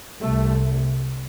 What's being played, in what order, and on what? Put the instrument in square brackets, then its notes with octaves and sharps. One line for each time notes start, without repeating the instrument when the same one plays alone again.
[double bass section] C2 C3 A3